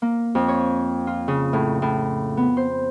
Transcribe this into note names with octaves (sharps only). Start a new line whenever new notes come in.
A#3
F2
C#5
F4
C#3
A2
A2
B3
C5